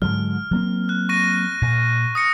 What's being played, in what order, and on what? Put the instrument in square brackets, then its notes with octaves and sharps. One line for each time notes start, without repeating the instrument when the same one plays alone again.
[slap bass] G#2 D3 F#3 [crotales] F6
[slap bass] F#3 A#3 C4
[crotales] F#6
C#6 A#6 D#7
[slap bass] A#2
[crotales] D#6 A#6 C#7